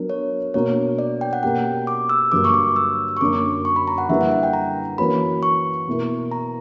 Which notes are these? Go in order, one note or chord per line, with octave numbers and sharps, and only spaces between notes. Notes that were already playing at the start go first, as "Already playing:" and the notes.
Already playing: F#3 B3 D4 A#4
C#5
B2 A#3 D4 F#4 C#5
D5
G5
F#5
B2 A#3 C#4 G4 G5
D6
E6
G2 D3 F#3 A#3 D6
C#6
D6
E6
C#6
F#2 D3 F#3 A#3 D4 D6
C#6
B5
A#5
F#5
D3 G3 A#3 E4 B4 E5
F#5
F#5
G5
A#5
E3 A#3 C#4 F#4 B4 B5
C#6
B2 A#3 E4 A#4
A#5